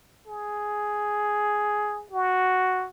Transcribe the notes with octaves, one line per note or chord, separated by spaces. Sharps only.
G#4
F#4